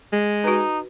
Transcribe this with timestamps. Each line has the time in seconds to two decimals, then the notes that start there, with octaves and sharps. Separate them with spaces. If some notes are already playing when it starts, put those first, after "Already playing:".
0.13 G#3
0.44 D#4 F#4 B4